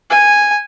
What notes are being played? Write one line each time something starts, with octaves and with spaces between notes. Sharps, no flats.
G#5